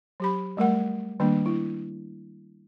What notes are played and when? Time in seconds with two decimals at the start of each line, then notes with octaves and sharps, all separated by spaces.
0.20 F#3 G4 B5
0.57 G3 A3 A#4 F#5
1.20 D#3 G3 A#3 D4
1.46 E4